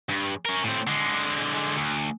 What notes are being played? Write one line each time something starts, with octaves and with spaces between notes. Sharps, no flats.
G2
C#4 A#4
A2 C4
D3 G#3
D2